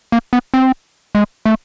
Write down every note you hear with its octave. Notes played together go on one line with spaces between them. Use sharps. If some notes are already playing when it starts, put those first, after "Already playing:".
A#3
B3
C4
G#3
A3